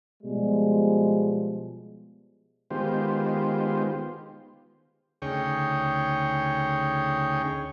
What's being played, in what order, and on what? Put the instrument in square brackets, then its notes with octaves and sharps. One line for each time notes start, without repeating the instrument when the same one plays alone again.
[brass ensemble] B2 F3 G3 G#3
[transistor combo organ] D#3 G#3 B3 F4 G4 C5
D2 C#3 D#4 G#4 C#5 G5